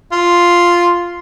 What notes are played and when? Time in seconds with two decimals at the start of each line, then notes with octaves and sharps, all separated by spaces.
0.12 F4